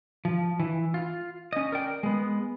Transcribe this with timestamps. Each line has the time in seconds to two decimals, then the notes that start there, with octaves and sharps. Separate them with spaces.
0.25 F3
0.60 E3
0.94 F4
1.53 C#4 D#5
1.72 A#4 D5 G5
2.03 G#3 B3